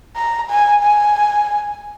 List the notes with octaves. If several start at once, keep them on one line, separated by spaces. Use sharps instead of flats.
A#5
G#5
G#5